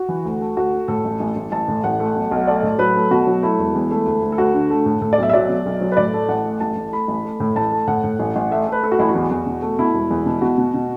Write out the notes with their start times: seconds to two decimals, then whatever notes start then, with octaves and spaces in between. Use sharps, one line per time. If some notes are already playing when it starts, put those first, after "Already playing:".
Already playing: F#4
0.09 E3
0.25 D2
0.41 A3
0.56 D2 F#4
0.73 A3
0.88 A2 A4
1.05 A1
1.20 A1
1.36 A1
1.52 A1 A5
1.68 A2
1.84 A1 F#5
2.00 A3
2.16 B1
2.31 B1
2.47 A3 D5
2.63 A2
2.79 F#3 B4
2.95 A3
3.11 B2 F#4
3.27 F#3
3.43 A3 E4
3.59 E1
3.75 E2
3.91 A3
4.06 D2
4.22 D2
4.32 A4
4.38 D2 F#4
4.54 D3
4.70 A3
4.86 A2
5.01 A2 A4
5.13 D5
5.18 B1 E5
5.29 E5
5.33 F#3 D5
5.49 B2
5.66 B1
5.81 F#3
5.92 B4
5.97 A2 D5
6.13 A3
6.29 A1 F#5
6.45 A3
6.60 A1 A5
6.76 A1
6.92 A3 B5
7.08 A1
7.24 A3
7.40 A2
7.56 A1 A5
7.72 A3
7.88 A2 F#5
8.04 A2
8.19 A1
8.36 A1
8.51 A3 E5
8.67 A3 B4
8.83 A3 A4
8.92 F#4
8.99 A1 E4
9.09 F#4
9.15 E2
9.31 E2
9.46 B2
9.62 A3
9.79 B2 E4
9.94 E1
10.10 E2
10.26 B2
10.42 B2 F#4
10.58 B2
10.74 B2